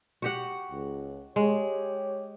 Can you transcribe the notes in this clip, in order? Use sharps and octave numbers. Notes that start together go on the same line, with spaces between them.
F#4 G4 F#5
C#2
G#3 G4 C#5